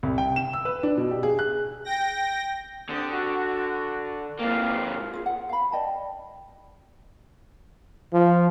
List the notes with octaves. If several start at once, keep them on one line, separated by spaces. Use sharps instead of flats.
C2
G5
E7
E6
B4
D4
B2
G4
G#4
F#6
G5 A#6
D3 C4 G4 D#6
F#4
G#2 A#3 C4 F5
F4 G#4
F#5
F5 B5
D5 D#5 G5 A5
F3